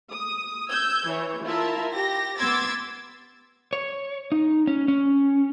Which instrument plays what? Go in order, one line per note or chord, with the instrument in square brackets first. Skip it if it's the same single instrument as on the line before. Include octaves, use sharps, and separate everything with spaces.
[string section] D#6
E6 G6 G#6
E3 C#5
E4 F4 A#4 E5 A5
G4 A#6
B3 C6 D6 E6 G#6 A6
[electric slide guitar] C#5
D#4
C#4
C#4